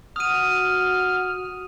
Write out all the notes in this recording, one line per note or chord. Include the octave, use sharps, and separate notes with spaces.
F#4 D#6 F6 D#7